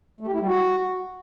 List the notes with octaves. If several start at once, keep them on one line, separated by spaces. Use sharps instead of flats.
A3
G4
E4
G3
F#4